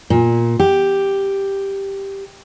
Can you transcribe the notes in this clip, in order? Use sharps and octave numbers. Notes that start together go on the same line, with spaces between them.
A#2
G4